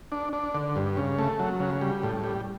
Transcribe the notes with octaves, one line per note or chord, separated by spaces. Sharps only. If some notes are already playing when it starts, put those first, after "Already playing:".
D4
D4
D3
G2
C#3
A3
F#3
C#3
G3
A2
G3